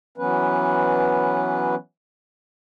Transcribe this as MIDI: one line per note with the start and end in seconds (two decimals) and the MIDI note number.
0.18 1.75 52
0.18 1.75 54
0.18 1.75 59
0.18 1.75 61
0.18 1.75 71